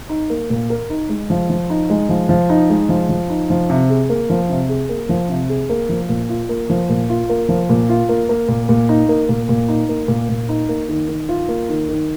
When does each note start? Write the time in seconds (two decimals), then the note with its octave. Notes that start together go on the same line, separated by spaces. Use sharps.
0.09 D#4
0.30 A#3
0.50 A#2
0.70 A#4
0.90 D#4
1.09 G#3
1.30 F3
1.50 F3
1.70 D#4
1.90 G#3
2.09 F3
2.29 F3
2.50 D#4
2.70 G#3
2.89 F3
3.09 F3
3.30 D#4
3.50 F3
3.70 C3
3.90 G#4
4.09 A#3
4.30 F3
4.50 C3
4.69 G#4
4.89 A#3
5.09 F3
5.29 C3
5.49 G#4
5.69 A#3
5.89 F3
6.09 A#2
6.29 F4
6.49 A#3
6.70 F3
6.89 A#2
7.09 F4
7.29 A#3
7.49 F3
7.69 A#2
7.89 F4
8.09 A#3
8.29 A#3
8.48 A#2
8.69 A#2
8.89 D#4
9.09 A#3
9.29 A#2
9.49 A#2
9.68 D#4
9.89 A#3
10.08 A#2
10.29 A#2
10.49 D#4
10.69 A#3
10.89 D#3
11.09 D#3
11.29 F4
11.48 A#3
11.69 D#3
11.89 D#3